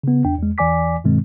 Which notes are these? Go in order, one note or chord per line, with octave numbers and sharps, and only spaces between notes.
C#3 B3
E2 D4 G5
E2 G#3
E2 E3 D5 G#5 D6 B6
G2 B2 D#3 G#3 C4